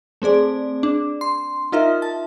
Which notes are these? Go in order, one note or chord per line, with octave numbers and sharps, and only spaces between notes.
A3 C4 G#4 D5
D4
C6
D#4 F4 A#4 E5
A5